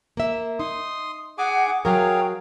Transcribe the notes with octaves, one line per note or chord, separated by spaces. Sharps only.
A#3 E5
D#4 C6 D#6
G#4 F#5 G#5 D6
F#3 G#4 A#4 C#5 F5 G5